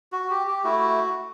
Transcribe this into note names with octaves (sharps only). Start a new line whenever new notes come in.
F#4
G4
G4
A3 E4 F#4